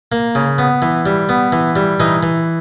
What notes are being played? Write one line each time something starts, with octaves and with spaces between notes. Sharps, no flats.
A#3
C#3
B3
E3
G3
B3
E3
G3
E3 D#4
E3